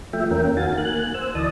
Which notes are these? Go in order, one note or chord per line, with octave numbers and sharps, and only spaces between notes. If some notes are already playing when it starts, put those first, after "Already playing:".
F3 A3 E5 G5
E2 A#3 C#4 A#4 G5
D#3 F#4 F5 G#5 A6
A#3 G#5 F#6
C5 E6
D2 E3 D5 D#5 A5 D#6